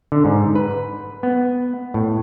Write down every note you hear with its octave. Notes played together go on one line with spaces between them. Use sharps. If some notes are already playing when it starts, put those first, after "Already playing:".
D3
G#2
B4
B3
A2